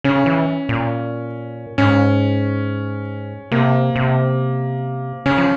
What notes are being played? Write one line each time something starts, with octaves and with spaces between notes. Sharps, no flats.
C#3 C#4
E3
A#2
G#2 C#4
C3 A#3
C3
C#3 C#4
F3